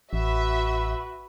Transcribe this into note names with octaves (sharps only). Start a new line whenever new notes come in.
A1 F#4 B4 E5